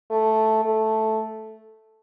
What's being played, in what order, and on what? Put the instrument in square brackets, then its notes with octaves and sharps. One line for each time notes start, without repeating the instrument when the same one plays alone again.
[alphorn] A3
A3